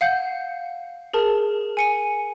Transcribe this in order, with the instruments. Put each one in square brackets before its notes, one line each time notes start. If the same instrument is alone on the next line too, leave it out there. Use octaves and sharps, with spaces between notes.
[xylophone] F5 F#5 G6
G#4 A#4 A5
G#5 C#7 D#7